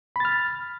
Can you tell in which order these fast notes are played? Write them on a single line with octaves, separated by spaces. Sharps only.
B5 A6 F6